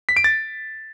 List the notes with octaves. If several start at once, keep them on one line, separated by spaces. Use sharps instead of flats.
B6
D7
A6